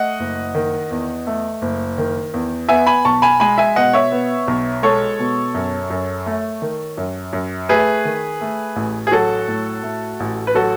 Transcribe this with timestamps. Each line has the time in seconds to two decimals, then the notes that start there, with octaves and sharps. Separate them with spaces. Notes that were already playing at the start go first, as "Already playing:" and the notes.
Already playing: A3 D#5 F#5
0.20 F#1
0.55 D#3
0.91 E2
1.27 A3
1.62 F#1
1.98 D#3
2.34 E2
2.69 B3 E5 G#5
2.87 G#5 B5
3.05 B1 A5 C#6
3.22 G#5 B5
3.40 G#3 G#5 B5
3.58 E5 G#5
3.76 B2 D#5 F#5
3.93 C#5 E5
4.12 B3
4.48 B1
4.83 G#3 A4 C#5
5.19 B2
5.54 F#2
5.90 F#2
6.26 A3
6.62 D#3
6.98 F#2
7.33 F#2
7.69 A3 G#4 B4
8.05 D#3
8.41 A3
8.76 A1
9.07 G#4
9.12 F#3 F#4 A4
9.48 A2
9.83 A3
10.20 A1
10.47 B4
10.55 F#3 F#4 A4